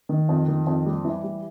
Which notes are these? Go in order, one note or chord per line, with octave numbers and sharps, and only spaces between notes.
D#3
F2
D#3
F2
G3
E3
G3